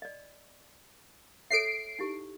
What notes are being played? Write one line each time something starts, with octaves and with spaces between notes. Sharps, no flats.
D5 D#5
A4 C#5 E5 C7 D7
D#4 E4 G4